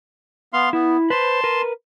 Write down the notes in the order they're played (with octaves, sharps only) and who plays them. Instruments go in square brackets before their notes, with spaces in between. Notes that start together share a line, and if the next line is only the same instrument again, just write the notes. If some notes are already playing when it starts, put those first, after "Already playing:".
[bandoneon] B3 F5 C6
[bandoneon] B3 [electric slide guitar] E4
[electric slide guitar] B4 C5 [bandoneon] A5 C6
[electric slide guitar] A#4 B4